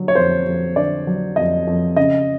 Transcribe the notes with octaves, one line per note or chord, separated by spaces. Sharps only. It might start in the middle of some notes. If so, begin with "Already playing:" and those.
Already playing: D3 F#3
C#5
F2 C5
F2
D3 D5
F#3
F2 D#5
F2
C#3 D#5